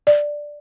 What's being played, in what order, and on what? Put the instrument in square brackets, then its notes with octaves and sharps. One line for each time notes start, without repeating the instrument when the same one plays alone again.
[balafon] D5